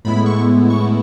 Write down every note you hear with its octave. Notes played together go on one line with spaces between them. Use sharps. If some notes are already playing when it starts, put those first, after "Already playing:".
A2 G#3 B3 E4 B5
C#6
C#6